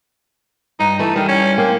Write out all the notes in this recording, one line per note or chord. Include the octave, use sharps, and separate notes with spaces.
G2 D#4
E3 A3 B4
D#3 G3 E4
C#4
A#3 C4